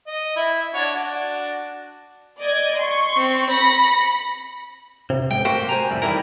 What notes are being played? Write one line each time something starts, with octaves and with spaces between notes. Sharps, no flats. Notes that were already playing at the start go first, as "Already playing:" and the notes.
D#5
E4
D4 F#4 C#5
D4 F#4
D5 D#5 G#6
C6 C#6
C4
B5 A#6 C#7
C3
B1 G#2 G5
A3 A#3 F#4 G4 C5 G5
C5 G#5 A#5
F2 A2 C3 G3
D#3 E3 G3 E4 A#4